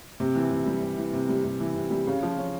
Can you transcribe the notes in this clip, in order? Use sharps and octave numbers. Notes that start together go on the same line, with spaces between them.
C3
E3
C3
G3
C3
E3
C3
G3
C3
E3
C3
G3
C#3
F3
C#4